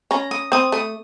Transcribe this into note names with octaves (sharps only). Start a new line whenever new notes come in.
C#4 A#5
D#6
C4 D#6
A3 D#6